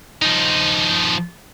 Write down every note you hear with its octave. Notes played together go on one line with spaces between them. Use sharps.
F3 D#4